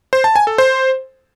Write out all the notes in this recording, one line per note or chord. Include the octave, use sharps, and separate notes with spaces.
C5
A5
G#5
A4
C5